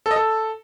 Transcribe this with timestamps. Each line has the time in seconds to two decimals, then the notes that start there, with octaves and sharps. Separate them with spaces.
0.06 A4
0.11 D#5
0.16 A4